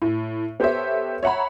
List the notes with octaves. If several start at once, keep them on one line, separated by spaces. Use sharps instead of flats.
A2
B3 G4 A4 C5 C#5 E5
C#5 E5 F#5 A#5 B5